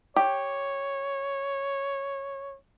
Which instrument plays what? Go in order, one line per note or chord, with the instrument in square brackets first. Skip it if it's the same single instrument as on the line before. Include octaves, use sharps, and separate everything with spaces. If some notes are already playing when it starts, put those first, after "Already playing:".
[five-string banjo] G4 [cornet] C#5